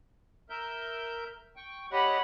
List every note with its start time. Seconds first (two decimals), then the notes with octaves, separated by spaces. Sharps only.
0.50 A#4 E5 G6
1.56 G5 C#6
1.92 G4 C#5 D#5 F#5 B5